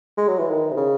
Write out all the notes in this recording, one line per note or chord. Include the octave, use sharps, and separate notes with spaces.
G#3
F#3
E3
D#3
C3
C#3